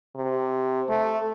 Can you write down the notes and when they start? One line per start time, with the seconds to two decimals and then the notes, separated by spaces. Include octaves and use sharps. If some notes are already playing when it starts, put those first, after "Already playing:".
0.16 C3
0.89 A3